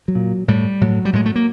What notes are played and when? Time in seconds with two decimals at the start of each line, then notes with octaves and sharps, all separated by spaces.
0.08 F#3
0.15 A#2
0.48 A2 G3
0.81 A2 F#3
1.05 G3
1.13 A2 G#3
1.26 A3
1.36 A#3